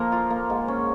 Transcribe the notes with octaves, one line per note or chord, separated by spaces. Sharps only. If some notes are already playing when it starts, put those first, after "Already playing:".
Already playing: F3 A#3 A#4
F4
A#3
G#2
C#4